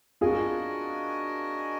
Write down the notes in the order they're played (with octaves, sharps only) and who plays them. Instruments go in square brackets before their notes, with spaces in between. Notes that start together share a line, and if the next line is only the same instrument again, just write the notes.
[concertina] D4 F#4 A#4 D#5 G#5 [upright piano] F4 G#4